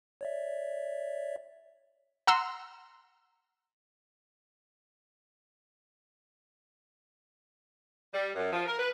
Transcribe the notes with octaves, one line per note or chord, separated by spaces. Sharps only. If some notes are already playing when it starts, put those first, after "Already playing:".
C#5 D5 E5
F#5 A#5 C6 E6
G3
F#2
F3
A#4
B4